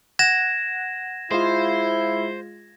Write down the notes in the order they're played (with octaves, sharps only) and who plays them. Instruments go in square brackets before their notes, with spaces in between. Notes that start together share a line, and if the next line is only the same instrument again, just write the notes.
[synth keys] F#5 [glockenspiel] G#6 A#6 E7
[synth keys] G#3 F4 [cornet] E4 [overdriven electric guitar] C5